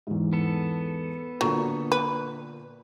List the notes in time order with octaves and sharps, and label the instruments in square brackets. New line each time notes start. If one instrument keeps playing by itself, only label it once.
[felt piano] E2 G#2
[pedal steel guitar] B3 A4
[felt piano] A#2 D3 [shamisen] F#3 A3
[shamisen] B4